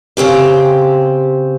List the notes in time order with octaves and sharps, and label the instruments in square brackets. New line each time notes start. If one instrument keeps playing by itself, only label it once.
[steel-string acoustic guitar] C#3 C4 G4 C5